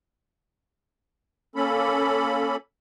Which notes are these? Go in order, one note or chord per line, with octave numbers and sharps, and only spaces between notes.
A#3 C#4 A4 B5